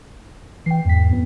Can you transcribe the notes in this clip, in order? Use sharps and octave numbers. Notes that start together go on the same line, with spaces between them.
E3 G5 C7
E2 G#2 B6
F2 B3